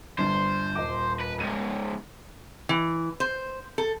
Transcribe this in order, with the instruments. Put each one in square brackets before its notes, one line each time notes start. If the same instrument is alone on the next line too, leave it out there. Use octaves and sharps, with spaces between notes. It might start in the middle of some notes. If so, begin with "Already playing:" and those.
[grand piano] G1 G2 [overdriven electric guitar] C5
[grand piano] D#1 D#5 D6
[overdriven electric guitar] B4
[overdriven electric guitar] C#2 G#2 [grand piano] D#7
[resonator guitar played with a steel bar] E3
C5
A4